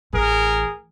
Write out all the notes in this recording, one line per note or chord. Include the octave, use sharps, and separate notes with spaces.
A1 G#4 A#4